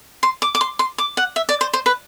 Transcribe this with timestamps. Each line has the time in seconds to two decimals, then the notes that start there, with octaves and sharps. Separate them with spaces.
0.23 C6
0.42 D6
0.55 D6
0.61 C6
0.79 C6
0.98 D6
1.17 F#5
1.36 E5
1.49 D5
1.61 C5
1.73 C5
1.86 B4